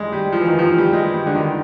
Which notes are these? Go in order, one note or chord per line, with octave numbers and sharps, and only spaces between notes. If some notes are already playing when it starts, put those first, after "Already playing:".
Already playing: G3 G#3
G3
F3
E3
D#3
F3
E3
G3
G#3
G3
D3
D#3